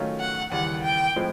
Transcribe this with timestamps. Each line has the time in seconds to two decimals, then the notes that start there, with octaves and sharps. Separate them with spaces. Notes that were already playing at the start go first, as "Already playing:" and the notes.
Already playing: D#3 F#3 A3 C#4 F4
0.20 F#5
0.52 D#2 C#3 E3 G3 F#5
0.84 G5
1.16 A2 F3 G#3 C4 E4